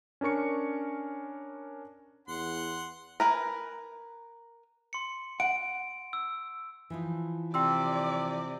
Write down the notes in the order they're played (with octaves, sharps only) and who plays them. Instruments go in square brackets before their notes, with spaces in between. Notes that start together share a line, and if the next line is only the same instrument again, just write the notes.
[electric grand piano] C#4 D4 A#4 C#6 C#7
[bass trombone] E2 [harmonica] F#5 C6
[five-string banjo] A#4 B4 G#5
[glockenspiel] C6 C#7
[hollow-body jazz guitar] F#5 [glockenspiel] D7
[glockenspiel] E6
[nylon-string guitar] E3 F3 D#4
[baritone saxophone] C3 [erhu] D5 [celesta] G5 C6 E6